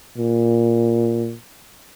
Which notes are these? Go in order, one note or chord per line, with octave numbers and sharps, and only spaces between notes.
A#2